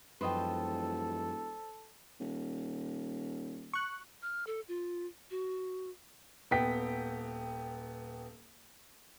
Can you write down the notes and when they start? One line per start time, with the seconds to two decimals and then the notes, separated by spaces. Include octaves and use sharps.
0.21 E1 F#2 F3 A4 B4 C5 D#5 G5
2.20 D#1
3.74 C#6 F#6
4.22 F6
4.47 A4
4.68 F4
5.31 F#4
6.51 D#1 B3 G5 B6